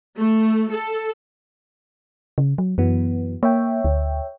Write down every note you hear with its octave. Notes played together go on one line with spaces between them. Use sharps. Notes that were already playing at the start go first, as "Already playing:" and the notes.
A3
A4
C#3
F#3
F#2 E3 F#3 B3
A#3 C#5 E5 G5
D2